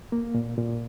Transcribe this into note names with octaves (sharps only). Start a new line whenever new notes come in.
A#3
A#2
A#2